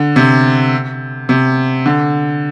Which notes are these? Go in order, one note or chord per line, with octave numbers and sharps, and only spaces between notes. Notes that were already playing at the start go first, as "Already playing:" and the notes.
Already playing: D3
C3
C3
D3